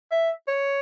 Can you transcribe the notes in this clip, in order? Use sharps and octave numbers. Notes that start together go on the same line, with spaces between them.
E5
C#5